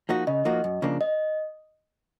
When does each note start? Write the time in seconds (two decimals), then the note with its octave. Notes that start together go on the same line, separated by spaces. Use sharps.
0.09 F3 A#3 D#4 F#4
0.27 C#3 D#5
0.45 F3 A#3 D#4 F#4
0.64 F#2
0.82 C#3 F3 A#3 D4
1.01 D#5